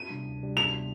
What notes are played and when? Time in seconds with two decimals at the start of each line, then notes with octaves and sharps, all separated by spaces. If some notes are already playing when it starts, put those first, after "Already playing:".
Already playing: D#7
0.09 C3 G3 D4
0.24 D2
0.40 C3 G3 D4
0.57 D2 F7
0.72 C3 G3 D4